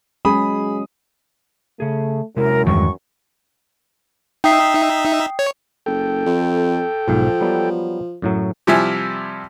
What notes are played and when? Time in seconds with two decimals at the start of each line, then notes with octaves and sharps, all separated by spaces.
0.25 F#3 G#3 C#4 G#4 B5 D#6
1.80 C#3 A3 G#4
2.36 F#2 C3 G#3 E4 A#4
2.66 E2 G2 D#3 F#3 G#3 C#6
4.44 D#4 E5 G5 D#6 C7
5.39 C#5
5.86 F#1 A4 G5
6.26 F2
7.08 B1 G#2 F3
7.41 F#3 G3 B3
8.22 F#2 A2 F#3
8.67 C3 F3 G3 E4 G#5